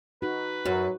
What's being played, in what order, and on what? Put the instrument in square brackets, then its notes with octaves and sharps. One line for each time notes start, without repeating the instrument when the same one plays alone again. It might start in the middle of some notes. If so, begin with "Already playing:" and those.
[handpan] D#4 F#4 [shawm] B4
[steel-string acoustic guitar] F#2 [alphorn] F#3 [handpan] F#4